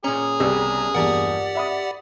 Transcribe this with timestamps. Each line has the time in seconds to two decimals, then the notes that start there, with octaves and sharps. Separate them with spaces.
0.04 A#2 C#4 G#4 A#5
0.40 C2 C#3 G3 B3 G4 E6
0.95 A#1 E2 G2 G4 A#4 D5 F#5
1.55 E5 B5 D#6